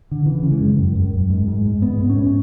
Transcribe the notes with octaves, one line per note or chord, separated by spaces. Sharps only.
D3
C#3 E3
C#3
G#3
F#2
F#2
F#2
F#2
G#2
G#2
G#2
G#2 B3
G#2
C#4
G#2